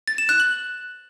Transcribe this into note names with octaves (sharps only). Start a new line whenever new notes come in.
A6
E7
F#6
F#7